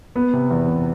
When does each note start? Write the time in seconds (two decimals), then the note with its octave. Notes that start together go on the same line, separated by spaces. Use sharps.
0.16 B3
0.33 C3
0.51 E2
0.68 C3